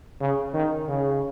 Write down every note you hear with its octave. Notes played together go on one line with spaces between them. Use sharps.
C#3
D#3
C#3